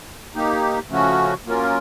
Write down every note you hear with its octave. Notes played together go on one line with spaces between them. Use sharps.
A#3 D#4 G4
C#3 F3 A3 C#4 F#4
F#3 A#3 C#4 F4 A#4